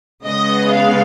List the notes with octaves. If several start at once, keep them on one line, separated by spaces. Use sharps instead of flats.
C#3 G#3 B3 D#5
F5